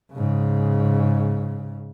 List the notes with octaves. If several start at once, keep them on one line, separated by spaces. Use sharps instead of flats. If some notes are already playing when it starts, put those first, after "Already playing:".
G#2 C#3